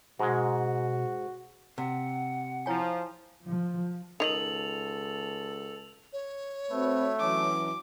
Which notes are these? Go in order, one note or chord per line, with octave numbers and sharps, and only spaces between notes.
G#2 B2 G#3 F#4
C3 F#5
F3 E4 C#5 G#5
F3
C#2 D#3 A4 D#5 F7 F#7
C#5
A3 C4 F#4 B4
E3 F#3 C#4 D6